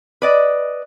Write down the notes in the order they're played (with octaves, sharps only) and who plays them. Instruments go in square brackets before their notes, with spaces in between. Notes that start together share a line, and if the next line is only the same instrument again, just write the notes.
[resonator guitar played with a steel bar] B4 D5 D#5